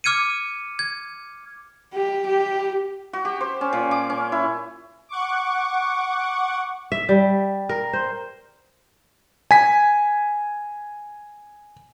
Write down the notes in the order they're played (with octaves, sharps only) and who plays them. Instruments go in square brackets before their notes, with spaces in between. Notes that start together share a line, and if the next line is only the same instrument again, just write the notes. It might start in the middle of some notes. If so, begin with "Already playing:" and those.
[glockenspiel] D6 F6 G#6 C#7 D#7
G#6
[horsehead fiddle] G4
G4
[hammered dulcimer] F#4
G4
C5
C#4
A#2
D6
C#4
E4
[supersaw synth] F#5 C#6 D6
[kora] E5
G3
A#4
C5
[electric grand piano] G#5 B6